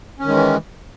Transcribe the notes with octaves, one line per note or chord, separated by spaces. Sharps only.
D#3 E3 G#3 C#4